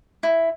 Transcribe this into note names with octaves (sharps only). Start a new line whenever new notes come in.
E4